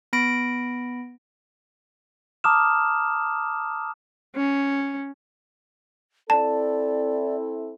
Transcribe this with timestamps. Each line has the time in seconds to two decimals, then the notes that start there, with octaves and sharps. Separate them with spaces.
0.13 B3 B5 A#6 D7
2.44 A5 A#5 D6 D#6 F6 E7
4.36 C#4
6.30 C4 E4 A4 D5 A5